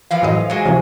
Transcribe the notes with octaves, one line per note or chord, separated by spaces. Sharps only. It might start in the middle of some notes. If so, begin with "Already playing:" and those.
E3 F3 F5
A2 F#3 D#5
F#3 G#3
C3 E3 F3